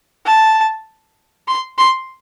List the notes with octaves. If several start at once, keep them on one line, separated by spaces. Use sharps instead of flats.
A5
C6
C6